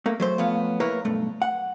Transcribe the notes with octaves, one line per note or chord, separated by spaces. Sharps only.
A3 A#3
F#3 A3 C5
F3 A3 B3 C#5 F5
A#3 E4 A#4 B4 C#5
B1 G2 A3
F#5